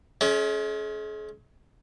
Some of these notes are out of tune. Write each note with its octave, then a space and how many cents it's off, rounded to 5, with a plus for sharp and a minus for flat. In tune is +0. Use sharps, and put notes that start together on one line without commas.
G#3 +40 C#4 +0